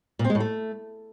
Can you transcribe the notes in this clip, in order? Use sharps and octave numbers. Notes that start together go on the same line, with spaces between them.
A#2
C4
G#3
A2
A3